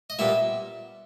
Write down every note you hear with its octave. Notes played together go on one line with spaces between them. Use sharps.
D#5
A#2 G3 B3 E5